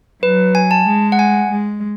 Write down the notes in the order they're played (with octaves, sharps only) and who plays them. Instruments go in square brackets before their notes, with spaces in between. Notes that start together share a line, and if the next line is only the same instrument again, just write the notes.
[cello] F#3 [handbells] B4
[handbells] G#5
A5
[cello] G#3
[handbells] F#5
G#5
[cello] G#3